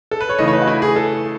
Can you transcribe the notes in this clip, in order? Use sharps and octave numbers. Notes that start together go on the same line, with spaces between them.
A4
B4
C#5
C#3 E3 A3 D#5
C#5
B4
F#4
E4
G#4
A4